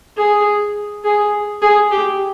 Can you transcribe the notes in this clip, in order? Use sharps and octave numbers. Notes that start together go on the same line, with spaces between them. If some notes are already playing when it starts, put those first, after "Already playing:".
G#4
G#4
G#4
G4